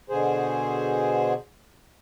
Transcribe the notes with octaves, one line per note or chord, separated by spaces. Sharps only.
B2 D3 G#4 C5